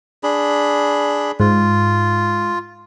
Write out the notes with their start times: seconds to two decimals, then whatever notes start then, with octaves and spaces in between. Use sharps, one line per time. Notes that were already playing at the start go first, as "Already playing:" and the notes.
0.23 D4 G#4 B5
1.40 G#2 F4